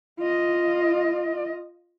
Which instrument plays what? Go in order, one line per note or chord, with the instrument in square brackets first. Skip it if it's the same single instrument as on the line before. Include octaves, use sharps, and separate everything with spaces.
[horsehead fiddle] F4 D#5